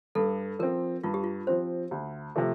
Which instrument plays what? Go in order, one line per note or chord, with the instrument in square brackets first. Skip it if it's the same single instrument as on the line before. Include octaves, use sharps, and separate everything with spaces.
[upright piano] G2 [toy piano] A4
[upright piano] F3 C4 [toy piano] A#4
[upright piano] G2 [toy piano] F4
[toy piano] G4
F4
[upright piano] F3 C4 [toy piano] C5
[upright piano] D2
C3 F3 A3